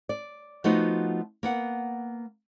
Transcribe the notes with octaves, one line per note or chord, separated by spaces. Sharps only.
D5
F3 A3 B3 D#4 F4 F#4
A#3 B3 F#5